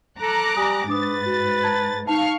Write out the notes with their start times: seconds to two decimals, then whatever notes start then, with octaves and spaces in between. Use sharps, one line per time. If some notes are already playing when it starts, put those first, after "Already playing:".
0.20 A4 A#5 D6 F#6
0.56 G3 G4 G#5 D#6
0.88 G#2 D4 B4 D6 D#6 A6
1.26 F#4
1.63 A5 A#5 G#6
2.07 D#4 F5 A5 C#6 F6